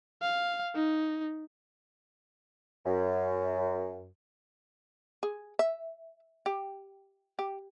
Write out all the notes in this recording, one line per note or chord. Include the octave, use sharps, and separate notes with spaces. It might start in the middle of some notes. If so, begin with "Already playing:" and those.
F5
D#4
F#2
G#4
E5
G4
G4